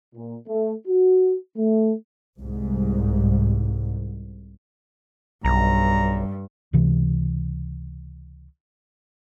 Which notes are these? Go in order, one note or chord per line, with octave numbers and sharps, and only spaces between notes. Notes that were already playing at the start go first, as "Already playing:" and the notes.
A#2
A3
F#4
A3
C2 G#2
B1 G2 A#5
C#2 C3 E3